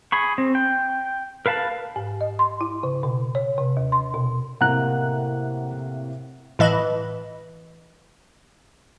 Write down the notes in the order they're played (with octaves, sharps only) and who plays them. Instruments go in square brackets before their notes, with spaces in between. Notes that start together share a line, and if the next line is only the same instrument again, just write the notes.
[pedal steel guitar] G#4 B5 C#6
C4
G5
A#4 B4 F5 A5 B5
[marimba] G#2
D#5
C6
E4
C#3
B2
C#5
C3
D#2
C6
B2
[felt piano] A2 C3 A#3 [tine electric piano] F#5 A#5 F#6
[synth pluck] A2 E3 D#5 B5